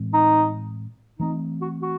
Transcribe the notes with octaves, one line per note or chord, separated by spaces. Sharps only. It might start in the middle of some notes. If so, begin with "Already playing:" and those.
Already playing: A2 E3 G#3 C4
D#4
E3 A3 C4 D#4
F#4
F#4